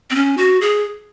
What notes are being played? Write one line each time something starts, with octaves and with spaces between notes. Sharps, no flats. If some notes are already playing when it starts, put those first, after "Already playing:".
C4
C#4
F#4
G#4